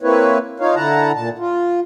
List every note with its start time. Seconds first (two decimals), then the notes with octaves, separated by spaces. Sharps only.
0.02 A#3 C4 E4 B4 C#5
0.60 D#4 F4 C#5 F5
0.75 D3 E4 F#5 A5 A#5
1.15 A#2 A5
1.39 F4